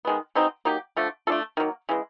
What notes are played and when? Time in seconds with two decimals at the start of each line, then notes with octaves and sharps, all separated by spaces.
0.05 D#3 G#3 B3
0.35 B2 G#3 C4 D#4
0.65 F#3 A#3 D#4 G4
0.97 D3 F3 A3 D4
1.27 A3 D4 F4 A4
1.57 D#3 F#3 A#3
1.89 C#3 E3 G#3